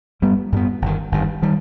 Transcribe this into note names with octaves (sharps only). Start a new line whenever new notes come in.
G2 G3 B3
G2 G3 B3
G1 G2 D#3
G1 G2 D#3
D#3 G3